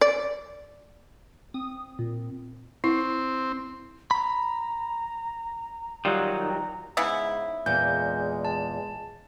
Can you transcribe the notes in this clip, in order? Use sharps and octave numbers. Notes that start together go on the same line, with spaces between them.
D5
C4 D#6
A#2
C4 E4
A#5 B5
D#3 F#3 G3 F4 A#5
G#2 C#3 B3 E4
E2 A#2 G#3 G6
A5